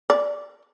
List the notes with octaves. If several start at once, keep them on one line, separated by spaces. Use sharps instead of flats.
D5